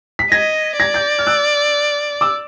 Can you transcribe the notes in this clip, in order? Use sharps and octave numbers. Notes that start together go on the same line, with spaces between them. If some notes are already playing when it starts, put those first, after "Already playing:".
B6
D#5 G#6 A#6
D5 G#6 A#6
G6 A6
F6
E6 F#6
D6 E6